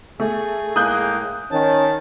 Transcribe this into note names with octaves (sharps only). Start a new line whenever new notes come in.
A3 G#4
A2 G#3 A#3 D#6 F#6 G6
D#3 C#4 A5